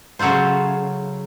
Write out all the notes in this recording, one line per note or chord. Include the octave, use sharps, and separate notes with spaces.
C#3 F#3 A3 F4 C5